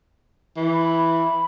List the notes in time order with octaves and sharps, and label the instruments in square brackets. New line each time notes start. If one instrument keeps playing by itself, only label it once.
[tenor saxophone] E3
[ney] B5